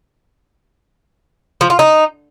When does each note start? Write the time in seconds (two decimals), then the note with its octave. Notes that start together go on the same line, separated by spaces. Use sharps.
1.61 F3
1.70 F4
1.79 D#4